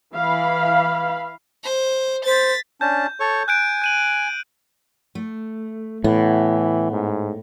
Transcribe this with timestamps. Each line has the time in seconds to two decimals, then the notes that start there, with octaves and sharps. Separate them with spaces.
0.15 E3 F5 B5
1.64 C5
2.25 C5 A6 B6
2.81 C#4 D4 A5 G6
3.20 A4 C#5 C#6
3.48 G#5 F#6 G6 D7
3.82 G6 D#7 F#7
5.15 A3
6.04 A2 E3 B3
6.92 G#2